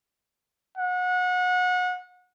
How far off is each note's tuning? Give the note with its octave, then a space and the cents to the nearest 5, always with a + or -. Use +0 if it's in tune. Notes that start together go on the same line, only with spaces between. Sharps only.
F#5 -30